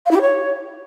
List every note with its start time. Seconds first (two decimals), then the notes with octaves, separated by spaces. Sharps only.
0.06 F5
0.11 E4
0.16 G4
0.21 C#5